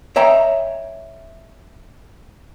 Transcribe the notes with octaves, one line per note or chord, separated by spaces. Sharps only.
C#5 D#5 E5 G5 A#5